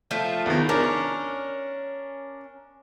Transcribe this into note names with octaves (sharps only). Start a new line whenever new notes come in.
F3 A3 F4
E2 D#3
C#4 D4 A#4